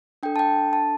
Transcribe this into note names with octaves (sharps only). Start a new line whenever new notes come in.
D4 A4 G5
A5
G5
A5